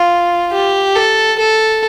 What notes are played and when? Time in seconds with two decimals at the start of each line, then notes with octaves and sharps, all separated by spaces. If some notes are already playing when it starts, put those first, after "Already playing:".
Already playing: F4
0.52 G4
0.95 A4
1.39 A4